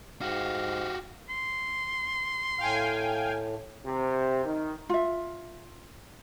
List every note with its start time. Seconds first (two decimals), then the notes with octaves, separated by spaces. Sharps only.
0.22 G#2 F#4 G4 F5
1.29 C6
2.58 A2 F5 G5 G#5
3.86 C3
4.44 D#3
4.89 F4 E5